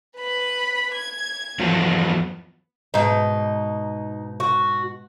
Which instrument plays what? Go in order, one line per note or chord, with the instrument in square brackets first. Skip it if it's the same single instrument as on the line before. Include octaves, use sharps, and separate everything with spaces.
[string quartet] B4 B5
G#6
[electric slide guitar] E2 F3 F#3 [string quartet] B3
[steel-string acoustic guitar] G#2 B2 [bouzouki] D#4
[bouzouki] F#4